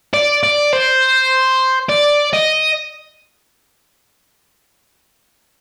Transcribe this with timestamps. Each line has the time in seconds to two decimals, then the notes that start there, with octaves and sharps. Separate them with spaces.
0.14 D5
0.43 D5
0.73 C5
1.89 D5
2.34 D#5